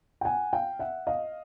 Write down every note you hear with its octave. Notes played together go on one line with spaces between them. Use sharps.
G5
F#5 G#5
F5 G5
E5 F#5
D#5 F5